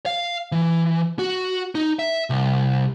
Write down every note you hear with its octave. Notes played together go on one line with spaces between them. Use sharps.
F5
E3
F#4
D#4
E5
C2